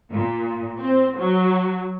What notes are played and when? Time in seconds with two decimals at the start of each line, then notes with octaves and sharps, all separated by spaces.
0.10 A#2
0.80 C4
1.19 F#3